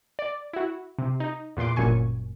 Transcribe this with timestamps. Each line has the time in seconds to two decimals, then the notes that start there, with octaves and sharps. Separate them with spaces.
0.19 D5
0.53 E4 F#4
0.99 C3
1.20 D#4
1.57 E2 A#2 B4 C6 D6
1.76 G1 F#2 A#2 G#5 C#6